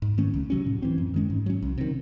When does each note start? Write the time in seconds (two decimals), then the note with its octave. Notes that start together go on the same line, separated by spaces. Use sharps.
0.02 G#2
0.18 D#3 A3 C#4
0.34 C#2
0.50 C3 F#3 C#4
0.66 A2
0.82 E3 C4
0.98 F#2
1.14 D#3 G#3 C#4
1.30 G#2
1.46 F#3 C#4
1.62 C2
1.78 C3 D#3